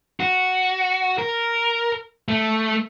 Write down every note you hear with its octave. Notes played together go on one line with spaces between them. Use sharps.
F#4
A#4
A3